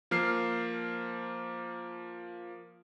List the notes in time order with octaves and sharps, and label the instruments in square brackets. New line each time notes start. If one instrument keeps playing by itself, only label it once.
[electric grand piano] F3 A#3 F6 C7